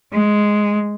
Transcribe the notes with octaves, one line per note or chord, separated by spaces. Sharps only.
G#3